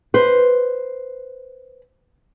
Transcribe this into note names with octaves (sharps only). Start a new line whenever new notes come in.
B4 C5